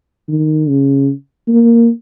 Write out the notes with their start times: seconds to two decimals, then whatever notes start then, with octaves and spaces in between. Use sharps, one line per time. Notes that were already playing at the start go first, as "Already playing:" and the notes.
0.29 D#3
0.68 C#3
1.48 A#3